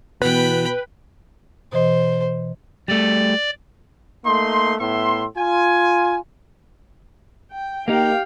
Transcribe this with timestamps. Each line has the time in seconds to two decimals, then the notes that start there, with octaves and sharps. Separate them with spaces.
0.22 B2 E3 B3 B4 G5 B5
1.72 B2 E3 C5 D#5
2.88 G3 A3 D5
4.25 A3 A#3 D#4 C6
4.78 A2 B3 E5 C6
5.37 F4 G#5
7.52 G5
7.88 A#3 D#4 G4 F5 G5